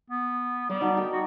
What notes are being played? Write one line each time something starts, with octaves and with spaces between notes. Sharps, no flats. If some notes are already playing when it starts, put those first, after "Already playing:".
B3
G3 D6
D#4 F#4 A5
A#4 G5
F#4